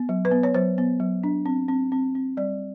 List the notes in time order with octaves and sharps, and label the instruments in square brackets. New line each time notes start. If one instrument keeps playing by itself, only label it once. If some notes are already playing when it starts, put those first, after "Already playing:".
Already playing: [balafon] B3
F#3
B4
B3
C#5
F#3 C5
B3
F#3
D4
C4
C4
C4
C4
G3 D5